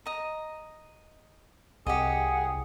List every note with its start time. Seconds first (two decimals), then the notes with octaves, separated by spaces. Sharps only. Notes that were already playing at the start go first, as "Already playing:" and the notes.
0.06 D#5 A#5
1.87 C2 G4 G#4 D#5 F#5